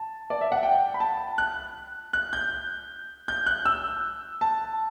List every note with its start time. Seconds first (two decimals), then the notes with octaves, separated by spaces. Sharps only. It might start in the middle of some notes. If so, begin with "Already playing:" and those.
Already playing: A5
0.30 D5
0.41 E5
0.52 F#5
0.63 G5
0.94 B5
1.00 A5
1.38 F#6
2.13 F#6
2.33 G6
3.28 G6
3.46 F#6
3.65 E6
4.41 A5